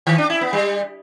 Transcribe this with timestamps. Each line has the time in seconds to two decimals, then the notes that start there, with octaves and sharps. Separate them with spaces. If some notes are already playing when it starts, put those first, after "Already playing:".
0.07 D#3
0.18 D4
0.30 E4
0.41 B3
0.53 G3